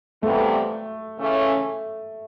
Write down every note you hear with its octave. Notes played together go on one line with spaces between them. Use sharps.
F2 C3 E3 G3 A3 B3
C#3 E3 A3 C#4